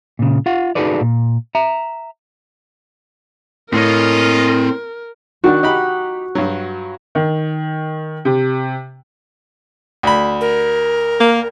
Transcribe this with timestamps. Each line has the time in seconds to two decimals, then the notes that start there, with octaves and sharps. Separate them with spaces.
0.19 A#2 C#3
0.46 F4 F5 F#5
0.75 D#4 F#4 G#4 A4 B4 D5
1.01 A#2
1.55 E5 A#5
3.73 A2 C4 F4 A#4 C#5 D#5
5.44 D#3 D4 F#4
5.63 D#4 G4 B5
6.35 G2 F#3
7.15 D#3
8.25 C3
10.03 D2 B5
10.41 A#4
11.20 A#3